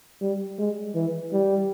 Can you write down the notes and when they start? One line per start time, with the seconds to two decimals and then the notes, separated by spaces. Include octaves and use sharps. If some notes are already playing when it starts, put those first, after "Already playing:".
0.21 G3
0.59 G#3
0.95 E3
1.33 G3